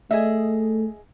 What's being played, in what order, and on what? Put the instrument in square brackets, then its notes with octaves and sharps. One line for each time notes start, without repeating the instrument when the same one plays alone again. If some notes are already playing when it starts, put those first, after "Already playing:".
[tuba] A3 [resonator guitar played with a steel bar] G#4 D#5 E5